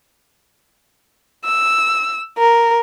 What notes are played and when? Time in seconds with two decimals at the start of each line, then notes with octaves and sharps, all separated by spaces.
1.45 E6
2.38 A#4